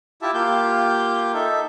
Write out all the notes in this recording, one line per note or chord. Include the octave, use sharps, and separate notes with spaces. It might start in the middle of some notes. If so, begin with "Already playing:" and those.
E4 F4 G4 E5 A5
A#3 F4 G4 F5 G6
D#4 A4 E5